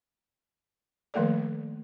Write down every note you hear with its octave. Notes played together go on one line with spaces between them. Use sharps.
D#3 F3 A3 A#3 A4 D5